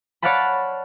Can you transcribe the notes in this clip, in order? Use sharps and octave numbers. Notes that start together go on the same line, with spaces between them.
C#5 D5 F5 F#5 A5 B5